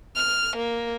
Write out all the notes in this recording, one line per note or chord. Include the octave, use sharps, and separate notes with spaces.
F6
A#3